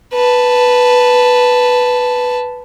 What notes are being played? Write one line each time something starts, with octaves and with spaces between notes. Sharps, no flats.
B4 A5